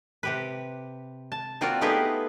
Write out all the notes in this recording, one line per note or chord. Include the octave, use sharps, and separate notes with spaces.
C3 G4 B4
A5
A#3 C4 F4 F#4 D5
A3 B3 D#4 G4 G#4 B4